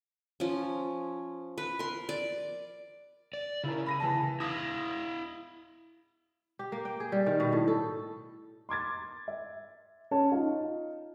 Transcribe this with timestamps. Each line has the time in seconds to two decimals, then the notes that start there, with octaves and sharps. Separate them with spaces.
0.40 F3 C#4
1.58 B4
1.79 A#4 C6
2.09 D5
3.33 D5
3.64 C#3 E4 A#4
3.86 B5 A#6 D#7
4.00 E3 A5
4.40 E4 E5 F5 D#6 A#6
6.59 G4
6.72 A#3
6.85 G5
7.00 G#4
7.12 G3
7.26 D#3
7.40 B2
7.52 A2
7.68 A4
8.69 C6 D6 G#6 A6
9.28 E5
10.11 C#4 C#5 A5
10.32 D#4 F4